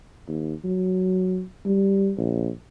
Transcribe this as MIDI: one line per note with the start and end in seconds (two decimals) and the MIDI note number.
0.28 0.53 39
0.64 1.43 54
1.65 2.12 55
2.17 2.49 34